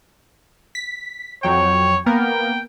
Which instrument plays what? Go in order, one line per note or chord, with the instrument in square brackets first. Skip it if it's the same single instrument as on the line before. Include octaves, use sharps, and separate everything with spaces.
[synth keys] B6
[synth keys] F2 F#3 G5 [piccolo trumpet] C#5
[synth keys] A#3 B3 A#4 [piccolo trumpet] G5